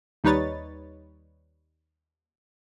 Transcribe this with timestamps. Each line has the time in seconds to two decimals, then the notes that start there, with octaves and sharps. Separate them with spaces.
0.24 D#2 G3 D#4 B4 C#5 A6